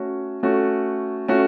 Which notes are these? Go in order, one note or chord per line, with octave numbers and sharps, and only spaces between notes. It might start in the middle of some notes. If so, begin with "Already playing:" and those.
Already playing: A3 C#4 F#4
A3 C#4 F#4
A3 C#4 F#4